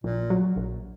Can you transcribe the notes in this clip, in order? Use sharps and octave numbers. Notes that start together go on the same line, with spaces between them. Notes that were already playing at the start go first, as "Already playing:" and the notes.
A#1 A#2
F#3
A#1